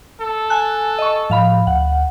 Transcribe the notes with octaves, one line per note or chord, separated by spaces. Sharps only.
A4
G#5 A5 F#6
D#5 C#6
A2 F3 F5 B5
D2 F#5